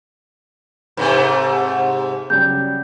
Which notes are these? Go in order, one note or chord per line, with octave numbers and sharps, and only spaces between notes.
G#2 C3 A3 B4 G#5
C#3 F#3 G3 G6